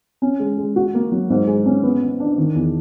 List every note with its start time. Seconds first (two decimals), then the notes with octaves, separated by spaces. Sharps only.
0.22 C#4
0.40 G#3
0.58 G#3
0.76 F#4
0.94 A#3
1.12 F#3
1.30 G#2
1.47 G#3
1.66 C#4
1.83 B3
2.02 B3
2.20 D4
2.38 D#3
2.55 E2